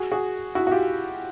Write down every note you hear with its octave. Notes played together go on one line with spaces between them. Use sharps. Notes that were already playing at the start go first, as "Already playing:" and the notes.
Already playing: F#4 G#4
F#4 G#4
E4 F#4
F#4
F4 G4